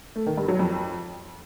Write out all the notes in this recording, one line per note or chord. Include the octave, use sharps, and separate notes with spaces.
A3
D#3
G2
F#3
F2